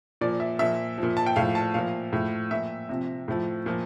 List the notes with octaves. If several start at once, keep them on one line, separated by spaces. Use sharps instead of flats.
A#2 F3 D5
E5
A#2 F3 E5
F3
A#2
A5
G5
A2 F3 F5
A5
A#2 F3 F5
A2 F3
A#2 F3 E5
C3 F3
A2 F3
A#2 F3